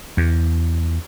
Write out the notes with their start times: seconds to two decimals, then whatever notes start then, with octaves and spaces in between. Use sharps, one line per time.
0.17 E2